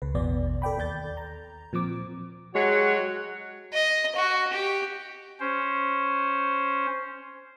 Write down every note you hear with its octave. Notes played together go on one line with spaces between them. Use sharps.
C#2 C#3 B4
A1 E2 B2 B3 D5
A4 D5 G5 B5
D#2 D5 G6 A6
A#5
A#2 F3 C4 D6
F#3 G#3 F#4 G4 C#5
D#5
F#4
G4
C#4 C5